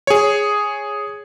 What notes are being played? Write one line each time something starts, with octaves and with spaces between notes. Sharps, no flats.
G#4 C#5